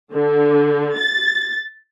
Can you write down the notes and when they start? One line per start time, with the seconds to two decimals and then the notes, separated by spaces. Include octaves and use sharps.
0.13 D3
0.98 A6